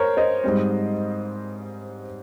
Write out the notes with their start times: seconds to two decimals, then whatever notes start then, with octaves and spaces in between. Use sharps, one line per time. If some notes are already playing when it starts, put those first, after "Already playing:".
Already playing: A#4 C5 C#5
0.17 C5 D#5
0.44 G#2 G3 C4